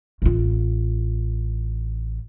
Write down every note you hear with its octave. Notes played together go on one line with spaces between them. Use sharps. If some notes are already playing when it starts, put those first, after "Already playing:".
A1 F4